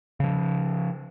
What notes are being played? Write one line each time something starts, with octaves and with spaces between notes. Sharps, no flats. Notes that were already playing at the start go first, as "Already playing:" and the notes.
C#3 F3